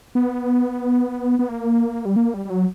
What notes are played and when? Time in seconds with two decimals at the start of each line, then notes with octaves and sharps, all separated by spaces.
0.15 B3
1.39 B3
1.49 A#3
2.05 G3
2.16 A#3
2.34 G3
2.45 G3
2.50 F#3